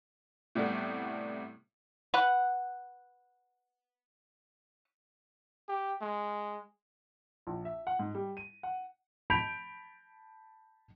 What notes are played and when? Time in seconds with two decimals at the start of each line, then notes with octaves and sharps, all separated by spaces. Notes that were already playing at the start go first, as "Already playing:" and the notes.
0.55 A2 C3 G3 A3 B3
2.14 B4 F#5
5.69 G4
6.02 G#3
7.47 A#1
7.65 E5
7.87 F#5
7.99 G#2
8.15 G3
8.37 D#7
8.63 F#5
9.30 A5 B5 G6 B6 D7 F7